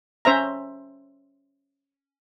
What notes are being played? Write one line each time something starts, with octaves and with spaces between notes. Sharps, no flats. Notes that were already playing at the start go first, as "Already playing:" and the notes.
C#4 C5 E5 A#5